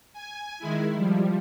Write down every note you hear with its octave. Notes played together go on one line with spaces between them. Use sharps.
G#5
D#3 G#3 E4
F3 G3